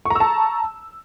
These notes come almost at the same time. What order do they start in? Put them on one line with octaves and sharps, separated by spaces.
C#6 A#5 E6 A5